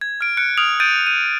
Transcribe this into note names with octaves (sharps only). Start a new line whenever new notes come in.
G#6
F6 D7
F#6 C#7 D7
D#6 F6 D7 F7
G6 A6 D7 D#7
D#7